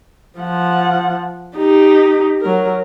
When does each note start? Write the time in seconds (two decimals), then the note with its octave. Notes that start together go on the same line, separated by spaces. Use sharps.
0.40 F3 F#5
1.56 D#4 G4
2.41 F#3 A#4